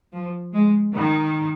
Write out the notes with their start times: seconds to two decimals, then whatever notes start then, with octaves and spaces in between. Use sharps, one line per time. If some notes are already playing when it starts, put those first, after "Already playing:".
0.12 F3
0.53 G#3
0.94 D#3